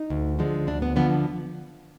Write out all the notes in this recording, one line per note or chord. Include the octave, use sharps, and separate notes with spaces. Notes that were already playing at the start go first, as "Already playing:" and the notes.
Already playing: D#4
D2
D3 F3 G#3
D2 D4
B3
D3 F3 B3